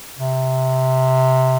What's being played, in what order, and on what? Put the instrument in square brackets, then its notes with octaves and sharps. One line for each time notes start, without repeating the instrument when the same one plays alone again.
[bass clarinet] C3